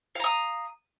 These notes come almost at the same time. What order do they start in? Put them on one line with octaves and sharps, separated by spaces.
F5 A#5 D#6